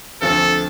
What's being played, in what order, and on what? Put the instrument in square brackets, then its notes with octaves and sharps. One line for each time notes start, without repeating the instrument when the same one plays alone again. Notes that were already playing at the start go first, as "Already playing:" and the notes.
[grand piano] D2 D3 F3 C4 [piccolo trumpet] A4